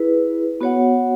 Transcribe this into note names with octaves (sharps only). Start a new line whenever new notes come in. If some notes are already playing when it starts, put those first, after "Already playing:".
Already playing: E4 G#4 B4
B3 F#4 C#5 F#5